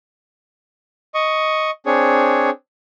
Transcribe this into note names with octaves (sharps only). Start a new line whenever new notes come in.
D#5 C#6
C4 D4 G#4 C#5